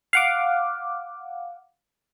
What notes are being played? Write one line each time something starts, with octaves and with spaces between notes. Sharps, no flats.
F5 F#5 D6